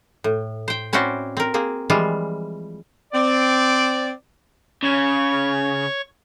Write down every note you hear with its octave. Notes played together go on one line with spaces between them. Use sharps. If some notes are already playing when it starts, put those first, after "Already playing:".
A2
C5 G5
C4 C#4 E4 F#4 C5 D5
C4 A#4
A#3 C4 G#4
E3 F3 G3 G#3 F4
C4 D5
C#3 C#5 C#6